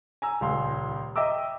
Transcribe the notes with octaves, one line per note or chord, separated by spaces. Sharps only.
G#5 A#5 E6
D#1 C#2 F5 C6
D#5 E5 G5 A#5 D6 E6